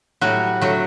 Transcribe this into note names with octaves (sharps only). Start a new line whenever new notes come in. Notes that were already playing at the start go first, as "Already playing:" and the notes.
A2 F#3 G3 F#4
D3 F#3 A3 F#4